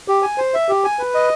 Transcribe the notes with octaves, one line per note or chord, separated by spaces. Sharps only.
G4
G#5
C5
E5
G4
G#5
B4
D#5